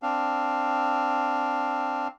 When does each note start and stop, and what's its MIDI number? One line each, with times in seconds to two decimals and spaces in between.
0.02 2.08 60
0.02 2.08 62
0.02 2.08 77